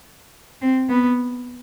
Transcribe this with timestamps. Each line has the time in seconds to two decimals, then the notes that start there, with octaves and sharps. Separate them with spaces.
0.62 C4
0.89 B3